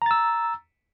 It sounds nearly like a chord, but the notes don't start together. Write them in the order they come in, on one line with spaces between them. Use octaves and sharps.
A#5 A6 E6